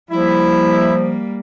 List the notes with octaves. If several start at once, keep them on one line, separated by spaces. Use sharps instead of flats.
F3 G3 A#3 E4